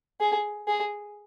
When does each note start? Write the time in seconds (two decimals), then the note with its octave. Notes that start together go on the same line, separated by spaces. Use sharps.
0.20 G#4
0.68 G#4